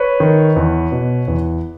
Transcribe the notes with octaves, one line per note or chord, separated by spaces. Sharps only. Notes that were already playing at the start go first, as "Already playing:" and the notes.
Already playing: B4 C#5
D#3
E2
B2
E2